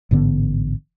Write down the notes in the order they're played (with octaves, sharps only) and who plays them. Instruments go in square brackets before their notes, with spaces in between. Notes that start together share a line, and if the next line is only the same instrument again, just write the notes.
[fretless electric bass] A1 G#2 D3 B3